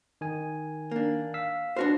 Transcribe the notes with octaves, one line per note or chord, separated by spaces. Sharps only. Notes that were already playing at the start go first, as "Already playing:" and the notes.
D#3 G#5
A#3 D4
F5 E6 B6
D4 F#4 B4 C5 F6